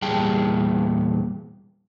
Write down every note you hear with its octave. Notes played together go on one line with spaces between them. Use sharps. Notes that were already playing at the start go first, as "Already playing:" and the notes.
E2 A#2 G3 G#4 G5 A5